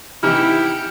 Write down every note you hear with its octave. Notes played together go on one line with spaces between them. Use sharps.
C3 E3 D#4 E4 G4 F#5 F6